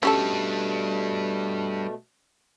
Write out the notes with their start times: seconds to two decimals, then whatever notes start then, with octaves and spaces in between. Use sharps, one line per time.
0.03 B2 G3 A3 C#4 D4 G4 A4